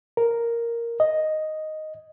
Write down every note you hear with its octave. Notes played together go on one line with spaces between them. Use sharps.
A#4
D#5